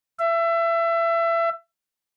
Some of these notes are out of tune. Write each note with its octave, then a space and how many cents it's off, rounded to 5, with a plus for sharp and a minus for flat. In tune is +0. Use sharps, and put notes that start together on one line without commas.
E5 +25